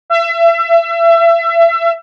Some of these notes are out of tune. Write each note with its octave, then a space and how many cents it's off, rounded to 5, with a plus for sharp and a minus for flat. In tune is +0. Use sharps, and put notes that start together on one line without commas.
E5 +30